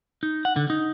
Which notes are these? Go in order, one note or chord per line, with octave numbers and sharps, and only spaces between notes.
D#4
F#5
D3
D#4